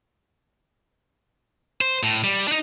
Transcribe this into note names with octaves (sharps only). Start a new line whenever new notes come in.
C5
A2
G3
D4 D#4